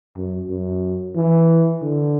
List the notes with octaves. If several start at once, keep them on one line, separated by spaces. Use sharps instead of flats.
F#2
F#2
E3
D3